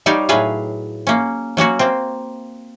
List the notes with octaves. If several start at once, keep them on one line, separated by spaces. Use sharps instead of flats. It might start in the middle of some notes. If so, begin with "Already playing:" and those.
G3 D#4 G4 C#5 D5 F5
A2 F#3 G#4 B4 F5
A#3 C#4
F#3 A#3 C#4 F#4
A#3 C4